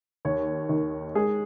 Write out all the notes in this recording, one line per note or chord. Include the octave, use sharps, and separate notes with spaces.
D#2 C#5
D#3
G#3 G#4